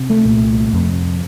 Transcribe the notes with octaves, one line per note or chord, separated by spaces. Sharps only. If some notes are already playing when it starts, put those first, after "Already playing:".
Already playing: C3
A3
C2 A#2
F2 C3